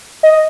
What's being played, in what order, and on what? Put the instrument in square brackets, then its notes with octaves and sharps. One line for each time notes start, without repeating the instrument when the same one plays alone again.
[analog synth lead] D#5